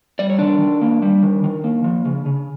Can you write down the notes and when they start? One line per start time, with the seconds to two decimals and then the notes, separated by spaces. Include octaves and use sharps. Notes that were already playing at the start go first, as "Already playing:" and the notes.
0.19 G3 D5
0.30 C#5
0.39 D#3 D4 D5
0.60 D#3
0.82 A#3
1.02 G3
1.23 D#3
1.44 D#3
1.64 A#3
1.84 F3
2.05 C#3
2.26 C#3